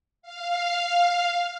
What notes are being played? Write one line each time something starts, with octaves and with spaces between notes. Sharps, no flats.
F5